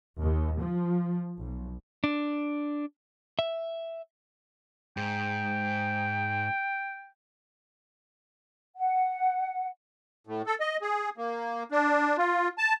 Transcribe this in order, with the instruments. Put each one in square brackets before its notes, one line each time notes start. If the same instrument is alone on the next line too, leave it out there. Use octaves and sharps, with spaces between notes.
[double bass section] D#2
F3
B1
[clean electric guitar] D4
E5
[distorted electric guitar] G#2 [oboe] G5
[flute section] F#5
[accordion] A2
A4
D#5
G#4
A#3
D4
F4
A5